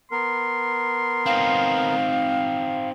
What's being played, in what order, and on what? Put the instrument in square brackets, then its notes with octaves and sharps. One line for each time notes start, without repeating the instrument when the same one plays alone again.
[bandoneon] B3 A#4 [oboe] C6
[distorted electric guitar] C4 D#4 [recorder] F5